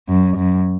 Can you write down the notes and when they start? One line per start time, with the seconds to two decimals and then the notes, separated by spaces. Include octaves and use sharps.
0.08 F#2
0.37 F#2